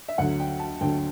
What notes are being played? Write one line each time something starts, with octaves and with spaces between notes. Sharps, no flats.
E5
D2 D3 F#3 F#5
G5
A5
D2 D3 F#3 G5